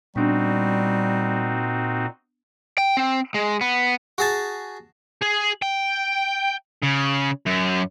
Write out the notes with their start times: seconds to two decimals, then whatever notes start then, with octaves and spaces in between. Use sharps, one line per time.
0.16 A#2 G3 B3 C4 D4 D#4 F#4
2.78 G5
2.97 C4
3.34 G#3
3.61 B3
4.18 F#4 G#4 A5
5.22 G#4
5.62 G5
6.82 C#3
7.47 F#2